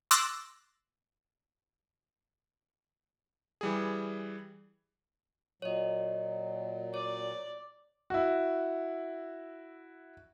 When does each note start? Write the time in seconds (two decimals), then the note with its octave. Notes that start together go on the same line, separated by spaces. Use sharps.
0.11 C6 D6 E6 F#6 A6 A#6
3.61 E3 G3 G#4
5.62 A#2 F#3 C#5 D#5
6.94 C#5 D5
8.10 E4 F#4